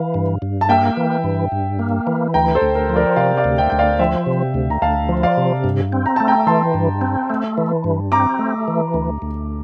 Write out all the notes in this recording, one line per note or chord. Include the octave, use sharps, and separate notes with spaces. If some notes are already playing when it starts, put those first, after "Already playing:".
Already playing: E3 F5
G2
G2
A5
A#3 E5 G5
E3
G2
G2
A#3
E3
D2 G5 A#5
A4 C5
D2
A#4
F3
A#4 D5
C3 D5 F5
D5 F5
D2
E5 G5
D2 G5
D5 F5
F3 E5 G5
C3
D2
A#5
D2 F5 A5
F3
D5 F5
C3
G2
C4
A#5
A3 A5
G5 A#5
E3 A5 C6
G2
C4
A3
E3
G2
C4 A#5 D6
A3
E3
D2
D2